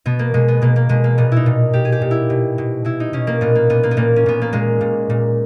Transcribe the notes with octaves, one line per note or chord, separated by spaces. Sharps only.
B2 B3
A#3
B2 G#3
B3
B2 A#3
A#3
B2 G#3
A#3
A#2 B3
D#4 E4
A#2
A#2 G4
G#4
G4
A#2
E4
B2
B2
B2 E4
D#4
B2 C#4
A#3
A#2 B3
A#3
A#2 B3
A#3
B3
A#2 A#3
C#4
A#2 B3
A#3
A#2 G#3
A#2
A#2